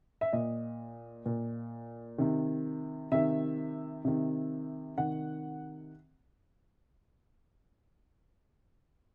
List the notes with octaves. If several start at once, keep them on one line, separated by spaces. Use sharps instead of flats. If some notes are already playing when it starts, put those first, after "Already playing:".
E5
A#2 D#5
A#2
C3 D#3
C3 D#3 E5
C3 D#3
C3 D#3 F#5